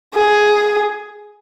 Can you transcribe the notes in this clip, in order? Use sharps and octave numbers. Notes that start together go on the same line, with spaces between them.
G#4